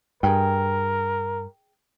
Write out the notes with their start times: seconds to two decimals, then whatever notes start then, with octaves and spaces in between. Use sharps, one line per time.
0.23 G2 G#4 A#4 G5